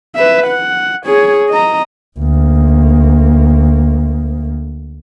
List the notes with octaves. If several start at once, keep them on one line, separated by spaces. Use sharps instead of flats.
B4 E5
F#5
G#4 C#5
D#5 A#5
D2 A#3